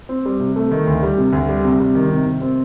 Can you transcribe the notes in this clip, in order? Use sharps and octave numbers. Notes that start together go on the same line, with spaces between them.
C4
G3
C3
A3
D#3
D2
G3
C3
D2
G3
C3
G3
D#3
C3
C3
C4